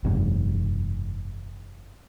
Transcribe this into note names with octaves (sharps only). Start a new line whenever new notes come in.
F#1 E2 G#2 C3